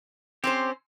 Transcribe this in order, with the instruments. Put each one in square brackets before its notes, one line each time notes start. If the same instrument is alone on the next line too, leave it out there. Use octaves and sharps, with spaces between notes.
[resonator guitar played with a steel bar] C4 C#4 C5 [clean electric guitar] G4